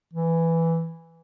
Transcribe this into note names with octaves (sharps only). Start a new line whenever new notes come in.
E3